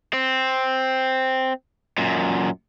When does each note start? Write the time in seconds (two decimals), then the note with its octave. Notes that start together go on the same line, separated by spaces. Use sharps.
0.13 C4
1.98 F#2 A#2